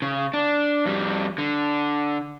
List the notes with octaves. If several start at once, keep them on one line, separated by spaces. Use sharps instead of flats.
C#3
D4
F2 G3
D3